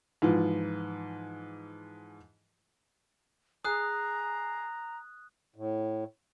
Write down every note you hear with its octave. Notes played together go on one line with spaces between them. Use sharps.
G#2 E3 F3
G#4 A#5 D#6 F#6
A2